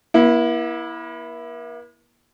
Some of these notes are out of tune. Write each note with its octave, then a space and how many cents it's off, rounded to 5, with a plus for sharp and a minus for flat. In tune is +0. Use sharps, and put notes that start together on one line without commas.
A#3 +45 E4 +0